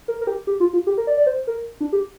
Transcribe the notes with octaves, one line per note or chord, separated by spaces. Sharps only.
A#4
A#4
G4
G4
F4
F4
G4
A#4
D5
D5
C5
A#4
D4
G4